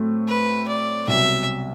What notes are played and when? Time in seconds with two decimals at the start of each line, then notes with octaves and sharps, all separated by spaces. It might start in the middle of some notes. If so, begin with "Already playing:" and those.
Already playing: A2 F#3 A3 C4
0.28 B4
0.68 D5
1.08 C2 B2 F#3 E5